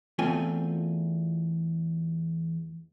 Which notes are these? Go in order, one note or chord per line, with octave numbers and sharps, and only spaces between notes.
E2 A3 C4 F4 G#5